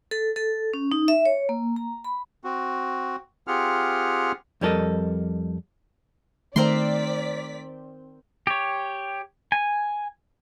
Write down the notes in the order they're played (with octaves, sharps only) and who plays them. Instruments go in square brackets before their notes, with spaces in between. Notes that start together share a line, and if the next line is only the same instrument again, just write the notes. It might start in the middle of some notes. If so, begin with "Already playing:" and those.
[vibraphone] A4
A4
C#4
D#4
E5
C#5
A#3
A#5
B5
[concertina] C4 F#4
C4 F4 G4 G#4 F#5 F6
[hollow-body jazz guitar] F2 G3 C#4 A4 A#4 D#5
[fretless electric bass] D#3 [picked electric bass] A3 [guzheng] C4 A#4 C6 [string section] D5 B6
[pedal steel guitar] G4 C#5
G#5